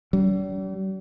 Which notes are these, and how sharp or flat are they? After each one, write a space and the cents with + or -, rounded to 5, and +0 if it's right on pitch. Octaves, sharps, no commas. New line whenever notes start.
G3 -45 C#4 +45